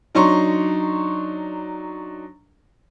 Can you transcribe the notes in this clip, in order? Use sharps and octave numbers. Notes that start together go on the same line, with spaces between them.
F#3 D4 D#4 A#5 C6 C#6